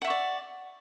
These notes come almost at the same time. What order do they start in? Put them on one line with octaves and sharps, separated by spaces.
F#5 E5 C#6 D5